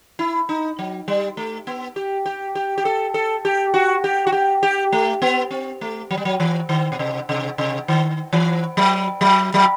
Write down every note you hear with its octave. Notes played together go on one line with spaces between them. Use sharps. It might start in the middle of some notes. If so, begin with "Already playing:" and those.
E4
D#4
F#3
G3
A3
B3
G4
G4
G4
G4
A4
A4
G4
F#4
G4
F#4
G4
G4
A3
B3
C4
A3
F#3
G3
F#3
E3
D#3
B2
C3
C3
C3
D#3
E3
F#3
F#3
F#3